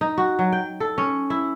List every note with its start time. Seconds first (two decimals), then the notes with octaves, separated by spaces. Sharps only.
0.01 D#4
0.18 F#4
0.39 F#3
0.52 G5
0.80 A4
0.98 C#4
1.30 E4